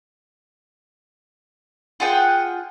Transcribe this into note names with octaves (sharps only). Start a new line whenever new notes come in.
F4 G#4 F#5 G5